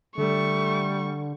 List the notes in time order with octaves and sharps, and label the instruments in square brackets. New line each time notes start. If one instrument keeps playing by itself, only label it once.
[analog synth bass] D3 [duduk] G3 [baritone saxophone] A3 [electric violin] C#6